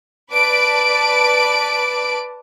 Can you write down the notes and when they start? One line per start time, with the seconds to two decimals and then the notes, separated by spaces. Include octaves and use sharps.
0.32 B4 D5 A5 D7